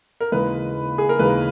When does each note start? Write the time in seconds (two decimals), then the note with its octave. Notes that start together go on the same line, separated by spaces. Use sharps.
0.20 A#4
0.32 D#2 C#3 E3 G#3 B4
0.98 G#4
1.09 A#4
1.19 D#2 C#3 E3 G#3 B4